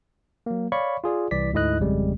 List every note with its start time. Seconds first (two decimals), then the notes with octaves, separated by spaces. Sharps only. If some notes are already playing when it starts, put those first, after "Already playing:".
0.46 F#3 A#3
0.72 C#5 D5 F5 B5 C#6
1.04 F4 G#4 D5
1.31 C2 E3 D5 B6
1.53 D2 G#2 A3 E4 D#5 F#6
1.80 G#1 F2 C#3 G3 G#3